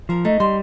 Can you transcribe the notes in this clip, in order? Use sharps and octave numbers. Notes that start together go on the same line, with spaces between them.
F3 A#4
A3 D#4
G3 C6